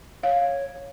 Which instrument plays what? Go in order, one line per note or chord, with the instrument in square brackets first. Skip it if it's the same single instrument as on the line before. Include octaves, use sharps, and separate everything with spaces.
[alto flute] C#5 [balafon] F5